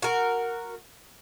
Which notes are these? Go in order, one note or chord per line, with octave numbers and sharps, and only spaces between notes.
F#4 A#4